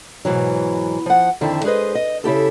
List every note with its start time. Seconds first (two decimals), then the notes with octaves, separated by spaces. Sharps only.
0.25 G#2 B2 E3 F#3
1.06 F3 F#5
1.41 F2 D3 D#3 E4 E5 A5
1.64 G#3 G#4 B4 C5 D#5
1.95 D#5
2.24 C#3 E4 G4 A4